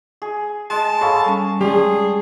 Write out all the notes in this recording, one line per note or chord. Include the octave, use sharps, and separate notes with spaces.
G#4
G#3 A5
G#4 A4 C#5 F5 B5
G3 C#4
G3 G#3 G#4 C6